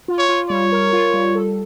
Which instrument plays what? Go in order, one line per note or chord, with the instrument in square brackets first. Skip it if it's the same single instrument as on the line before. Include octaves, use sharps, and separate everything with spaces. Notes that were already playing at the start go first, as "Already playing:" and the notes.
[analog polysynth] F4
[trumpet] C#5
[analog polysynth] F4
[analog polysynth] G3 [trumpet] C#5
[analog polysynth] A#4
F4
G3
A4